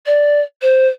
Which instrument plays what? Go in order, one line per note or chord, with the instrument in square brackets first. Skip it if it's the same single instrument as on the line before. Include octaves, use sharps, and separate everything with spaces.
[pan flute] D5
C5